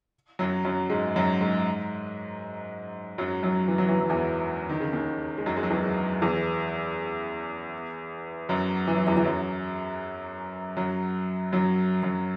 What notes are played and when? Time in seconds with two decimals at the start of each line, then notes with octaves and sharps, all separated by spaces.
0.39 F#2 F#3
0.65 F#2 F#3
0.90 G#2 G#3
1.16 F#2 F#3
1.41 G#2 G#3
3.18 F#2 F#3
3.43 F#2 F#3
3.68 E3
3.78 F#3
3.89 E3
4.00 F#3
4.09 E2 E3
4.69 D#3
4.80 C#3
4.93 D#2 D#3
5.38 G#3
5.46 F#2 F#3
5.57 G#3
5.63 F#3
5.70 E2 E3
6.22 E2 E3
8.49 F#2 F#3
8.88 E3
8.97 F#3
9.07 E2 E3
9.17 E3
9.24 F#2 F#3
10.77 F#2 F#3
11.53 F#2 F#3
12.03 F#2 F#3